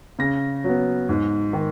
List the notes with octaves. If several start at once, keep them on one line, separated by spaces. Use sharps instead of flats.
C#3 A#6
F#3 B3
G#2
D#3